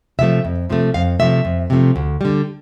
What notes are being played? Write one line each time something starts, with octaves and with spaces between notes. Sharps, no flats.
C3 F3 A3 E5
F2
C3 F3 A3
F2 F5
C3 F3 A3 E5
F2
C3 F3 A3
D2
D3 G3